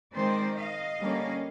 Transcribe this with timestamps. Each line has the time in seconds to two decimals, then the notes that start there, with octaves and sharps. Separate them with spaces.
0.14 D#3 G#3 C4 C5 D5
0.56 D#5 F5
0.99 D3 G3 A#3 C#4